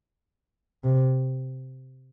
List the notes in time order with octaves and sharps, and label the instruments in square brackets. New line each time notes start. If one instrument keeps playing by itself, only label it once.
[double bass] C3